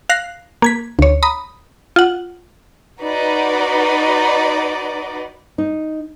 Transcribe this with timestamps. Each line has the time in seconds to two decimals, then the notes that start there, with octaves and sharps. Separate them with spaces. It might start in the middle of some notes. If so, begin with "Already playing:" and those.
0.09 F5 F#6 A#6 C7
0.62 A#3 G#6 B6
0.99 D2 C#5
1.23 A#5 B5 D#6
1.96 F4 F#5
3.01 D#4 F#4 B4 D5 D#5
5.58 D#4